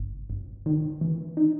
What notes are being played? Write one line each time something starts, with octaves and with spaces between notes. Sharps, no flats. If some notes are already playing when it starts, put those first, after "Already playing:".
Already playing: G1
G1
D#3
E3
D#4